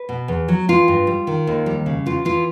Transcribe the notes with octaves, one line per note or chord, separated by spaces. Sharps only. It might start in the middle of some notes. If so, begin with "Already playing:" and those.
Already playing: B4
B2
E2
F#3
E3 F4
G2
G3
D#3
D#2
G3
C#3
E2 F4
E3 F4